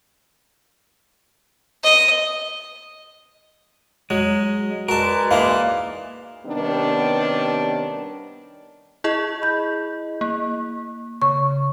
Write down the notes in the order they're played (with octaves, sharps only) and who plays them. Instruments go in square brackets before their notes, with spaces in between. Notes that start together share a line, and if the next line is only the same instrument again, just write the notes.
[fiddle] D#5
[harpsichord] F#3 [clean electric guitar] G#3
[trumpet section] G#3 B4 D5 [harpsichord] F#4 A5 [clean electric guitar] A#4
[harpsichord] E3 A#3 D#4 [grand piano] F5
[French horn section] C3 D#3 G3 B3 C#4 D4
[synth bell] E4 G#4 D#5
[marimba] B5 G6
[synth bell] A#3
[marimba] C#3 C#6